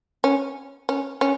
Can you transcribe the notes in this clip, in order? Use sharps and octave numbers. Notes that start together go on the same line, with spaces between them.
C#4
C#4
C#4